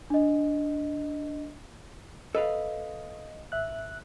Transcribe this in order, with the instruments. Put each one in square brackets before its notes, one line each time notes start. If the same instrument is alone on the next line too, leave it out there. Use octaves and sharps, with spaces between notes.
[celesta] D4 D#5
[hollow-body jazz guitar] A4 B4 F5 [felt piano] D#5
[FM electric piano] G#1 E5 F#6